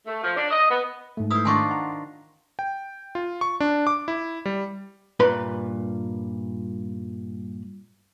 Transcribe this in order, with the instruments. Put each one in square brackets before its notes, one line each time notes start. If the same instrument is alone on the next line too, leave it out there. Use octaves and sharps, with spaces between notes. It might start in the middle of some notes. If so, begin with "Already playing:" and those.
[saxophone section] A3
F3
D4
D#5
B3
[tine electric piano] G#2 A3
[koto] E4 C5 [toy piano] B4 D#6 E6
[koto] D#3 D4 F4 [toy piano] G#5 C6 C#6
[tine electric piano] F#5 A#5
[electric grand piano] G5
F4
C#6
D4
D6
E4
G3
[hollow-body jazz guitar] G2 A#2 B4 B5 C6